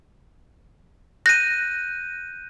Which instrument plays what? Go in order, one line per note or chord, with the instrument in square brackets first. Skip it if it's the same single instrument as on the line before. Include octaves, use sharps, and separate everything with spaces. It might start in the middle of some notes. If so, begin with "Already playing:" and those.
[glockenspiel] F#6 G6 D#7 [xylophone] A#6